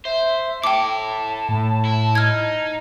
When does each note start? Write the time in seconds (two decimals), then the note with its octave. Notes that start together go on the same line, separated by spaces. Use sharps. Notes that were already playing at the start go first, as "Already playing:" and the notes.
0.05 C5 E5
0.64 E4 A4 G5 A5 D6
1.49 A2
1.85 E4
2.15 D#4 F6 G#6